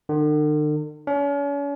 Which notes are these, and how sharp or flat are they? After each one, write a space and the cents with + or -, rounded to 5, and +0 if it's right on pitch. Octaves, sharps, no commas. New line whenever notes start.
D3 +45
C#4 +40